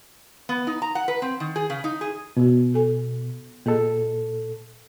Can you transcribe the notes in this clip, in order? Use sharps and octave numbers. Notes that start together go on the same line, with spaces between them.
B3
D#4
A#5
F#5
B4
C4
D#3
G#4
C#3
D#4
G#4
B2 B3 F#4
A4 G#5
A#2 A#3 G#4 A4 D#5